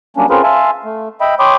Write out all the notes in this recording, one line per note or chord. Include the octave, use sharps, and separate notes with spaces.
F#3 G3 A#3 C#4 D4
C4 C#4 F4 G#4 A#4 B4
E5 F5 G#5 A5 C6
A3
D#5 E5 G5 B5
C#5 G5 B5 C6 D6 D#6